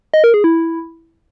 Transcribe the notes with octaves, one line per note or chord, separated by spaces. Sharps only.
D#5
A#4
G#4
E4